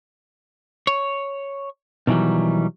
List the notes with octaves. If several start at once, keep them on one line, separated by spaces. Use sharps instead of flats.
C#5
B2 D#3 E3 F#3 G3